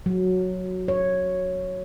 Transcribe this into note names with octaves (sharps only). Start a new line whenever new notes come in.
F#3
C#5